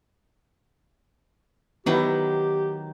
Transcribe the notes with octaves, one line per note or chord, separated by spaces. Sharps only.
D#3 F#3 B3 E4 G4